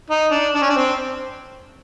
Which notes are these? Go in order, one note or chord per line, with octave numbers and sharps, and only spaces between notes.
D#4
D4
D4
C#4
D4
C4